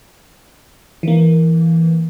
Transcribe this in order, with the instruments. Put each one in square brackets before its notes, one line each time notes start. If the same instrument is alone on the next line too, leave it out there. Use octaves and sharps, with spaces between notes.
[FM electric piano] E3 A#3